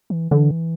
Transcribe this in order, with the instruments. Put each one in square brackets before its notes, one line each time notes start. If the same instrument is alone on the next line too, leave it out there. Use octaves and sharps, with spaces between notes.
[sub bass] E3
[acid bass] D3 [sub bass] E3